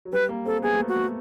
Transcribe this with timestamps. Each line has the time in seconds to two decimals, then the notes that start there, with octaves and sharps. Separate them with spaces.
0.05 F#3
0.13 G3 B4
0.29 A#3
0.45 C4 A4
0.62 B3 G#4
0.74 A3
0.80 A#3
0.88 F#4
0.96 A3